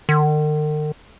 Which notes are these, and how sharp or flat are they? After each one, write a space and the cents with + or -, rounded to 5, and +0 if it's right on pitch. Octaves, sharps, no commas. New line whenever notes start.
D#3 -45